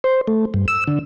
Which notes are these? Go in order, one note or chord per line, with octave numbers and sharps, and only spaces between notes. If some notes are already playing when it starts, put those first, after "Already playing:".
C5
A3
G2
E6
D3